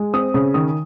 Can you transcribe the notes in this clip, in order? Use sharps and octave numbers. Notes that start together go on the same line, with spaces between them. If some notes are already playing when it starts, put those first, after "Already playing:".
Already playing: G#3
C4 D#6
C#3 D#6
D#3 D#6